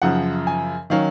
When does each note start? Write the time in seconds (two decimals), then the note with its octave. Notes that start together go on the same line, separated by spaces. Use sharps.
0.02 F#2 C#3 F3 F#5
0.47 G#5
0.90 D#3 F#3 C#4 F5